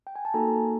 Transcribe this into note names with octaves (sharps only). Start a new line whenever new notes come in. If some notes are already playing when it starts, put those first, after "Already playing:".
G5
G#5
A5
A#3 D#4 F#4 A4 G#5 A#5